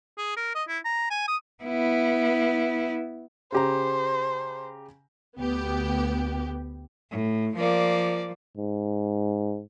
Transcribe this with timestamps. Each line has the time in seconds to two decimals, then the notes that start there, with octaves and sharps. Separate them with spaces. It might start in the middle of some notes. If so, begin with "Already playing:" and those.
0.18 G#4
0.37 A#4
0.55 D#5
0.68 E4
0.85 A#5
1.10 G#5
1.28 D#6
1.64 B3 E4
3.52 C#3 G4 C5 A#5
5.38 D2 B3 G4
7.10 A2
7.57 F3 A#3 D5
8.57 G#2